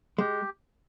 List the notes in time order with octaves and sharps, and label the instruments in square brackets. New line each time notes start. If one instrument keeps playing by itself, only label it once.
[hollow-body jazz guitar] G#3 [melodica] G4